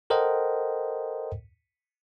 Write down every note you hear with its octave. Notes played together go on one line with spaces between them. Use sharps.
A4 A#4 C5 D#5 F#5 G5